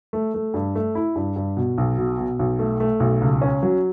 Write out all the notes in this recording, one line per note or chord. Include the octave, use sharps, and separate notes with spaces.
A3
A3
G2
A3
E4
G2
G2
B2
B1
B2
B2
B1
A3
A3
B1
C#2
C#4
F#3